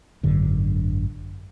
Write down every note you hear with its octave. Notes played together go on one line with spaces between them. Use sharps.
G#1 F#2 D3 D4